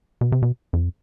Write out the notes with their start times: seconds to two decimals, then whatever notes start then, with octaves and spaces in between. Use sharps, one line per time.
0.21 B2
0.32 C3
0.42 B2
0.73 F2